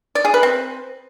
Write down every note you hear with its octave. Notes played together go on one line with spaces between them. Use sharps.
D5
G#4
B4
C4